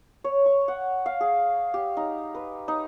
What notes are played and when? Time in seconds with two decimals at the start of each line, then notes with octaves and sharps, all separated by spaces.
0.24 C#5
0.46 C#6
0.68 F#5
1.06 F5
1.20 G#4
1.74 G4
1.97 D#4
2.35 B4
2.68 D#4